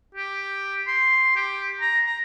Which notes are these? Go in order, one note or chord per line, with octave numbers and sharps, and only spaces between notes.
G4
C6
G4
A#5
A#5